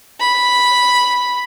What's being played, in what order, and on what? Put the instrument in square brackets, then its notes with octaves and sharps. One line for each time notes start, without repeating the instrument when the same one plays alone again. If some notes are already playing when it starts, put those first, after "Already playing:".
[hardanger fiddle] B5